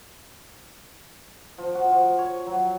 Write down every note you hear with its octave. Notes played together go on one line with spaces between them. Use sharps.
F3
F#4
F3
C#5
F#3